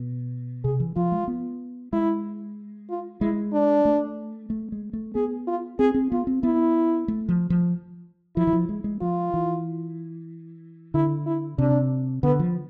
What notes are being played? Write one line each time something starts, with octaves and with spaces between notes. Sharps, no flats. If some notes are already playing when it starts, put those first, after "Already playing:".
Already playing: B2
C3 G#4
E3
F3 F4
G#3
B3
G#3 E4
F4
G#3 E4
D4
A3
A3
G#3
A3
B3 G#4
F4
C4 G#4
C4
B3 F4
C4
B3 E4
A3
F3
F3
F3 E4
E3
F3
G#3
G#3
F3 F4
E3
D3 E4
E4
C3 D4
D3 B3
F3